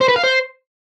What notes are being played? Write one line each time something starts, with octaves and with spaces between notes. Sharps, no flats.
C5
B4
F5
C5